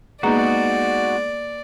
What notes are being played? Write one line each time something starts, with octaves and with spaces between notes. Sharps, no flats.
G#3 A#3 B3 D#4 F#4 G#4 D5 A#5